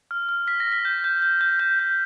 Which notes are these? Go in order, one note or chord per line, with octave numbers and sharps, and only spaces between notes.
F6
F6
F6 B6
A#6
F6
B6
G6
G6
G6
G6
G6
G6